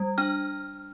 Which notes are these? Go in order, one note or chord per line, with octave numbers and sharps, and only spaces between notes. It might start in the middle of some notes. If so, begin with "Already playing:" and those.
Already playing: G3
D4 F6